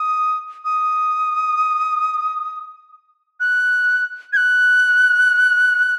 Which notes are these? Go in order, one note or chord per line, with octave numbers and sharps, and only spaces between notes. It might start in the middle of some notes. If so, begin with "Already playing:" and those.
Already playing: D#6
D#6
F#6
G#6
F#6